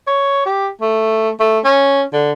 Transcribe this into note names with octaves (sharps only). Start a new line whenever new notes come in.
C#5
G4
A3
A3
C#4
D3